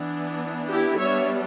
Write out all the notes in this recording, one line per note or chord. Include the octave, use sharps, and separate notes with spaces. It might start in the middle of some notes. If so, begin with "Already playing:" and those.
Already playing: E3 B3 D4
E4 G4
G3 B3 D4 C#5 E5